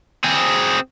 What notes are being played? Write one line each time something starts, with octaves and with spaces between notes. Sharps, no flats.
C4 G#4